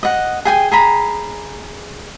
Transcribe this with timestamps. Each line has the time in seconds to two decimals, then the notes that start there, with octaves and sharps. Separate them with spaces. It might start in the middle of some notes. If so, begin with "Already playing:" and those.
0.03 D#5 F#5
0.45 G#4 G5 G#5
0.71 G#4 A#5 B5